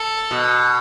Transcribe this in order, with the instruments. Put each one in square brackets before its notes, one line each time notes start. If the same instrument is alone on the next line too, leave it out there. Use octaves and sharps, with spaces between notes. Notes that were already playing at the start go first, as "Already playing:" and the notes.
Already playing: [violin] A4
[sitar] B2